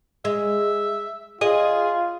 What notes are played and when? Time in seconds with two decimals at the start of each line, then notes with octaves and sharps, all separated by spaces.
0.25 G#3 E5
1.41 F4 G#4 D#5